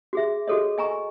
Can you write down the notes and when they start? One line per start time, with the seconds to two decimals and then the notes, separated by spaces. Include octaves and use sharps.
0.13 F#4 G#4 E5
0.48 F#4 G#4 A4 C#5 D#5
0.78 D#5 G#5 A#5 C#6